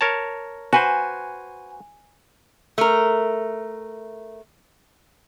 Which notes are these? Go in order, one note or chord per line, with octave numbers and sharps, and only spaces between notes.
A#4 C#5 A5
F#4 B4 C5 G#5
A3 A#4